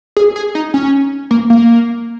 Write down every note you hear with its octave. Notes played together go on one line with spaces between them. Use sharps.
G#4
G#4
D#4
C#4
A#3
A#3